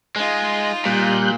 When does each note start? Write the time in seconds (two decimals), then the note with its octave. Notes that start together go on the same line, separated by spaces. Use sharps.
0.16 G#3 D#4 F4
0.86 A#2 G3 F#6 G6